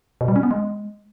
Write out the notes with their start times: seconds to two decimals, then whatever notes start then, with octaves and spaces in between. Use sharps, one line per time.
0.21 B2
0.28 G3
0.36 C#4
0.43 B3
0.51 G#3